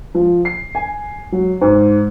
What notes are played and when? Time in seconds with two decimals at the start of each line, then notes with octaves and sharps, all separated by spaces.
0.14 F3
0.45 C7
0.75 G#5
1.32 F#3
1.61 G#2